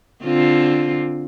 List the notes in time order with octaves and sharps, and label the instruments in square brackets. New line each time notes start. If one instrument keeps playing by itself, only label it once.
[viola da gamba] D3 C4 F4